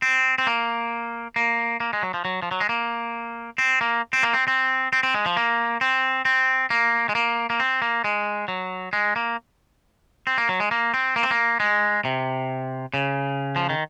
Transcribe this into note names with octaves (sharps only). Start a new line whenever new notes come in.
C4
C4
A#3
A#3
A#3
G#3
F#3
F3
F#3
F3
F#3
G#3
A#3
C4
A#3
C4
A#3
C4
C4
C4
C4
G#3
F3
A#3
C4
C4
A#3
G#3
A#3
A#3
C4
A#3
G#3
F#3
G#3
A#3
C4
A#3
F#3
G#3
A#3
C4
A#3
C4
A#3
G#3
C3
C#3
F3
D#3